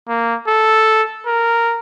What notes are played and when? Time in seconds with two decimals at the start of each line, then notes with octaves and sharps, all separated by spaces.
0.08 A#3
0.48 A4
1.27 A#4